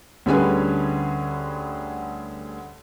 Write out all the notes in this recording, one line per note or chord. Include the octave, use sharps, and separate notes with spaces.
D2 D3 G3 C#4 G#4 B4